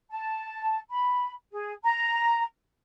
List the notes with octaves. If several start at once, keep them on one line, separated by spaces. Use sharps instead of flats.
A5
B5
G#4
A#5